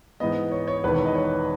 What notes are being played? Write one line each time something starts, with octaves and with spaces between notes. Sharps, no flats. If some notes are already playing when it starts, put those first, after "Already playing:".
G#2 E3 B3 D#5
C#5
C#5
E1 E2 D#3 B4
C#5
D#5
C#5